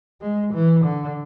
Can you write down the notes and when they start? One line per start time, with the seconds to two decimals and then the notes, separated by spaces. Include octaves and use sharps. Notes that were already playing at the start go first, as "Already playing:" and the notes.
0.21 G#3
0.54 E3
0.85 D3